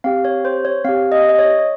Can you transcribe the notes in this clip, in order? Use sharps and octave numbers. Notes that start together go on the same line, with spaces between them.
C4 G4 F5
C#5
C5
C#5
C4 G4 F5
D#5
D#5
C#5
C#5